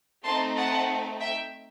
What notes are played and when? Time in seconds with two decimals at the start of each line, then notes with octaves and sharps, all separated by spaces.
0.24 A3 C4 D#4 A5 C6
0.56 F#5 A5
1.20 E5 G5